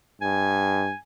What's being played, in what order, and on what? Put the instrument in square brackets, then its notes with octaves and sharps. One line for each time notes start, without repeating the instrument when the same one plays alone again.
[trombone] G2 [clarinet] G#5